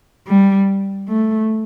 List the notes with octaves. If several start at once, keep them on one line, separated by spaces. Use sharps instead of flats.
G3
A3